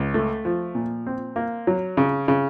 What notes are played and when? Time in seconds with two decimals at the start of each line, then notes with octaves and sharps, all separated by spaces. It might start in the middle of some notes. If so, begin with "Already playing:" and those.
Already playing: C#2
0.14 A3
0.45 F3
0.75 A#2
1.07 C4
1.36 A#3
1.67 F#3
1.97 C#3
2.28 C#3